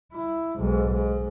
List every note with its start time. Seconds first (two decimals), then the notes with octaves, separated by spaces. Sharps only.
0.13 E4
0.58 B1 G#2
0.92 G#2